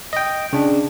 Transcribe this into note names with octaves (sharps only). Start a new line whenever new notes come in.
D#5 G5
C#3 D4